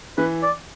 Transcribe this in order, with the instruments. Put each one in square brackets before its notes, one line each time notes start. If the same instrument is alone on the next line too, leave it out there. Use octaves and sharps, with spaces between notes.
[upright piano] E3 [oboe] B4
[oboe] D5